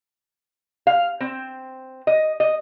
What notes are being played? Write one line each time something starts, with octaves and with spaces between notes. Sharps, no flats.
F5
C4
D#5
D#5